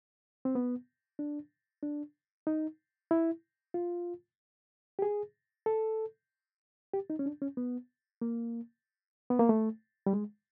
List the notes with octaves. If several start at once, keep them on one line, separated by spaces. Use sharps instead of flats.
C4
B3
D4
D4
D#4
E4
F4
G4
G#4
A4
G4
D#4
C#4
D4
C#4
B3
A#3
B3
A#3
A3
G3
G#3